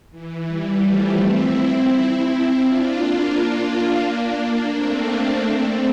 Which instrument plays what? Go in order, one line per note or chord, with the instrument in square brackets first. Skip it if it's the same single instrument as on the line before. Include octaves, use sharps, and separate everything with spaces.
[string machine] E3
E3 G3
F3 A3
C4 E4
D4 F4
A#3 D4
A#3 D4
A3 C4
A3 C4
A3 C4